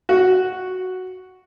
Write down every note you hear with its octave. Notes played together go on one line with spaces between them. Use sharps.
F#4